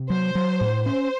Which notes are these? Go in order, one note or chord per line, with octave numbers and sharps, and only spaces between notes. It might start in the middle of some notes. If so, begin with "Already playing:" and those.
Already playing: C3
F#3 C5
F#3
A2
C#4 C5